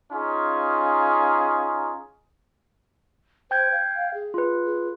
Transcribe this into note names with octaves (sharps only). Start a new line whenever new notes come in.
C#4 D#4 F4 G#4
C5 G5 G6 G#6
F5
G#4
F4 B4
G#4